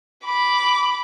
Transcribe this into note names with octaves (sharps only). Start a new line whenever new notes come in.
B5 D6